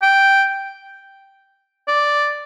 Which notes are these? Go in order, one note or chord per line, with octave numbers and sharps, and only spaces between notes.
G5
D5